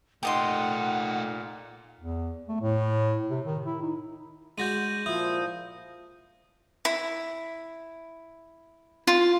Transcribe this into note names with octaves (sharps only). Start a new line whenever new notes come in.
A#2 A3 D#4 G4 D#5 F#5 C6
E2
A3
A2
C3
D#3
E4
D#4
G#3 D4 F#4 G6 A#6 D#7
A#2 F3 E4 D#6
E4
F4